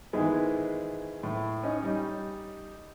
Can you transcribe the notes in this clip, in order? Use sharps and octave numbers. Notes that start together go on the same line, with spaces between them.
G#2 D#3 E3 G#3 B3
A2
C#4 D#4 D#5
G3 D#4